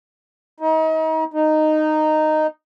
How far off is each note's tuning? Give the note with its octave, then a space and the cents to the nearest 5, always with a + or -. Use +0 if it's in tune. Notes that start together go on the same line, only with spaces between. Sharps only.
D#4 +35
D#4 -10